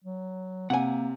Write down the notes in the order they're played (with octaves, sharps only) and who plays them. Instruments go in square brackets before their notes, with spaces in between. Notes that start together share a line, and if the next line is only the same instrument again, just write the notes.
[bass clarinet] F#3
[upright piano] C3 [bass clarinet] A#3 [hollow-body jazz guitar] F#5 G#5